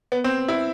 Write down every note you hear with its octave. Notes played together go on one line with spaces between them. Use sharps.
B3
C4
E4